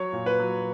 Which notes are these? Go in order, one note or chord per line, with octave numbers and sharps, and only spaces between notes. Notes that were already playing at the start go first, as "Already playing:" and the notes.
Already playing: F#3 C#5
A#2
B4
F#3